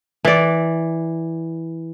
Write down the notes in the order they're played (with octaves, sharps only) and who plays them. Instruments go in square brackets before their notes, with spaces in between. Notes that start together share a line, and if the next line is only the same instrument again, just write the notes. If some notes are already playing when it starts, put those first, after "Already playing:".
[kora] E3 D5